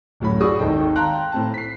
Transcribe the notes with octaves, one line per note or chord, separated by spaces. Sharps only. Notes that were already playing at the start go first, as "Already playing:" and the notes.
D1 F#2 A2 C#5 B5
F#4 G#4 D5 C#6 D#6 E6
G#1 D#2 D#3 A4 D#5 G5
F5 G5 A5 A#5 C6 F#6
A2 C4 A5
B6 C7